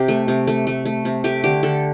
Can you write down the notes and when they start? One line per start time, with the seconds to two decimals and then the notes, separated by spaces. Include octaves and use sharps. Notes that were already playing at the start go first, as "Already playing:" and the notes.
Already playing: C3 G4
0.08 A3
0.28 C3
0.47 A3
0.67 A3
0.85 A3
1.05 C3
1.24 A3 G4
1.44 D3 G4
1.63 D3 A4